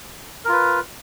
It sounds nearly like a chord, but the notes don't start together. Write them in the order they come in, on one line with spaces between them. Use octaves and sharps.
A#4 F4 B4